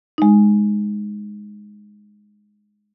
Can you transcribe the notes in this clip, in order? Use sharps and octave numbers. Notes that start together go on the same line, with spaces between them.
G#3 D#4